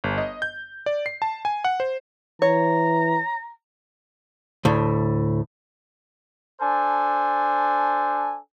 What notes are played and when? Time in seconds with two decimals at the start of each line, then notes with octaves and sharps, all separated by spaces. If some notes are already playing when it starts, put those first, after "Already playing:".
0.04 G1
0.18 D#5
0.42 G6
0.86 D5
1.06 C7
1.22 A5
1.45 G#5
1.64 F#5
1.80 C5
2.42 E3 C#5 A#5
4.65 D2 A2
6.61 D4 A4 C5 G#5